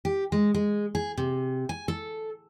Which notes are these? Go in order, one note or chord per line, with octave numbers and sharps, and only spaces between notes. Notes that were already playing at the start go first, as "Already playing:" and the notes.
G4
G#3
G#3
G#4
C3
G#5
A4